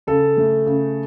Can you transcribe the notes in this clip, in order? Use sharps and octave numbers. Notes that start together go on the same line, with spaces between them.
C#3 A4
A3
C#3